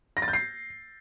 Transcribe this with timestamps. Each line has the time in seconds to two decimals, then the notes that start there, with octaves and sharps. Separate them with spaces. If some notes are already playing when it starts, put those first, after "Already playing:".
0.17 A#6
0.22 A6
0.28 G6
0.33 C7